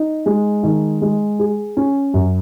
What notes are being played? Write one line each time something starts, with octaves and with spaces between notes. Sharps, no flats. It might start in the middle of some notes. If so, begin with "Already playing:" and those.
Already playing: D#4
G#3
D#3
G#3
G#4
C#4
F#2